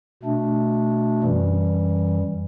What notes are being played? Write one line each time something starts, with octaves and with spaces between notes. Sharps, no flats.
B2 A3 D4
F#2 E3 G3